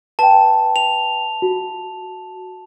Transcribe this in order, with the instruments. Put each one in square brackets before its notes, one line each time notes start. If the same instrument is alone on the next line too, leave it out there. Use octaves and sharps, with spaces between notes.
[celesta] B4 G5 [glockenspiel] A5
[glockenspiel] F7
[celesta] F#4